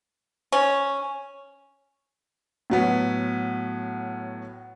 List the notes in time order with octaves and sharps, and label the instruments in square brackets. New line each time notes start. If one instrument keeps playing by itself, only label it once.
[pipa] C#4
[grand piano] A2 F#3 B3